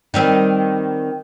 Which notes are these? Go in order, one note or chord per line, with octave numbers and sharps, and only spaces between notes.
D#3 G3 C4